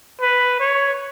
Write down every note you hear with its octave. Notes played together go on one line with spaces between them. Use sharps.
B4
C#5